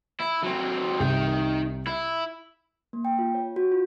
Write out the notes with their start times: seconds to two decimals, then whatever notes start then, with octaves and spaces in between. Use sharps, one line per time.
0.20 E4
0.43 F#3 C4
1.00 C2 D#4 G5
1.87 E4
2.93 A#3
3.05 G5
3.19 F4
3.35 C#5
3.56 F#4
3.72 F4